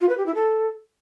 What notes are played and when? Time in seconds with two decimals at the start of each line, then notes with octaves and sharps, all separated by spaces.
0.01 F4
0.09 B4
0.18 G4
0.26 E4
0.34 A4